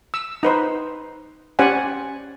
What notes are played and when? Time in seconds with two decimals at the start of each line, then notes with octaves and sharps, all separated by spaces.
0.14 E6
0.43 D#4 B4 C5
1.59 C#4 G4 C5 D5 F#5 G#5